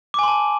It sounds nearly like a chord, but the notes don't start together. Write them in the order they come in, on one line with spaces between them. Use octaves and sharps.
D6 G#5 C6 A5